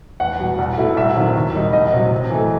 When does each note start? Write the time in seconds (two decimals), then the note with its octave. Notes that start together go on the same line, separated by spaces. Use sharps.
0.20 E2 F#5
0.39 B2 G3
0.58 C2
0.77 B2 A3 E4
0.96 C2 E5
1.16 C3 D#3 F#3
1.35 D#2
1.54 D#3 G3 D#4
1.73 C2 D#5
1.93 C3 F#3
2.12 C3
2.30 E3 A3